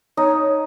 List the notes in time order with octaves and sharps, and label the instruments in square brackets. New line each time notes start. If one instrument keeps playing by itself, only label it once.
[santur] D#4 [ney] C#5